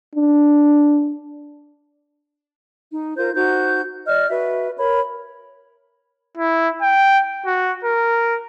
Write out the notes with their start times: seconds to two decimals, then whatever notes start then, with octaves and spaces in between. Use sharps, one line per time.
0.16 D4
2.92 D#4
3.16 F4 A#4 C5 G6
3.34 D#4 F#4 C5 G6
4.07 D5 D#5 F6
4.28 F#4 B4 E5
4.77 A#4 C#5 B5
6.37 E4
6.82 G5
7.46 F#4
7.84 A#4